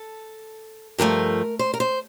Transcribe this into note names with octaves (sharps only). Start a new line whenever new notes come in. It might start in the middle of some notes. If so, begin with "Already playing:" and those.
Already playing: A4
G2 F3 A3 A#4
C5
A#4
C5